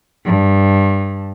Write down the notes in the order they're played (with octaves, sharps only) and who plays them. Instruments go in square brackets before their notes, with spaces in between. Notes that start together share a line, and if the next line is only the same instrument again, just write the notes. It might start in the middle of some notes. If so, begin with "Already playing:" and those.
[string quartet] G2